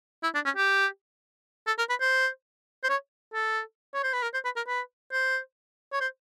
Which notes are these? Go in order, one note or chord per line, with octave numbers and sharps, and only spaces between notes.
E4
D4
C#4
G4
A4
A#4
B4
C5
C5
C#5
A4
C#5
C5
B4
A#4
C5
B4
A#4
B4
C5
C#5
C5